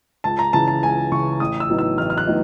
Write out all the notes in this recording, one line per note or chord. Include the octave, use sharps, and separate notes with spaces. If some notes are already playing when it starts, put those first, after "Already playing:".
C#2 A5
A#5
C#3 E3 A5
A5
C#2 G#5
C#3 E3 C#6
A1 D#6
E6
A2 F#3 B3 D#4
E6
A1 F6
F6
F#6
A2 F#3 B3 D#4